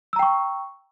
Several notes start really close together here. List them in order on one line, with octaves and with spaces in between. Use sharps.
E6 A#5 G5 C#6